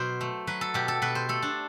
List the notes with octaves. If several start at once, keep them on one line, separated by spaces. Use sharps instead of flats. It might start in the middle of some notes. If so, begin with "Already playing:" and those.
Already playing: B2 F#3 C5
A3
F#3 B4
A4
B2 G4
A4
B2 B4
C5
A3 A4
D4